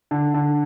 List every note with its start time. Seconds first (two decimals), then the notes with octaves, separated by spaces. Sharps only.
0.11 D3
0.34 D3